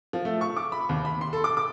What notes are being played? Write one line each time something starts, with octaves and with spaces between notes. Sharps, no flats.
F3
A3
C#6
D6
B5
D#2
B5
C6
A4
D6
D6